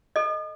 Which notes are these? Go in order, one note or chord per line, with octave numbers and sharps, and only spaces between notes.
A4 D#5